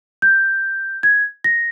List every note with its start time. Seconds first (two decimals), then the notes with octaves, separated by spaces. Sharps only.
0.22 G6
1.03 G#6
1.44 A#6